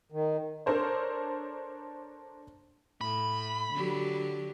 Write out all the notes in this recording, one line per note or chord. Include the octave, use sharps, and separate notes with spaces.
D#3
D4 A4 A#4 C5 C#5
A2 B5
D3 F#3 G4